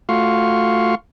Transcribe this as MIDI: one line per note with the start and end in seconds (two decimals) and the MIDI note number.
0.09 0.95 57
0.09 0.95 65
0.09 0.95 66
0.09 0.95 77
0.09 0.95 84
0.09 0.95 85